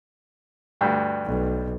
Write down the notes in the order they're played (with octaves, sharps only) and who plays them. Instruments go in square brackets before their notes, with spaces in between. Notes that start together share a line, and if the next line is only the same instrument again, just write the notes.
[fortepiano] D2 G2
[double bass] B1